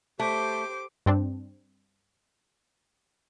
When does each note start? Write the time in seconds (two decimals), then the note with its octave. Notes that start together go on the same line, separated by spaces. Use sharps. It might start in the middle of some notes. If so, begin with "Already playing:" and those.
0.20 A3 G4 C5 D6
1.06 G2 C4 D4